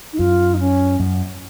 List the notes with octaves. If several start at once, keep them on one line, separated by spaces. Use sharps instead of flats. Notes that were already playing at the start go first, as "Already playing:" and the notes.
D#4
F#2 F4
D#4
C#4
F#2